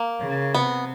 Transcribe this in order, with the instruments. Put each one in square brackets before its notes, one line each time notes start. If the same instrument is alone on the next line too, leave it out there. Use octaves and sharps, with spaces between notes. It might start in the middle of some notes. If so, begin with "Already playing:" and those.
Already playing: [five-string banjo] A#3
[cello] C#3
[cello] C3 [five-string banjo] B3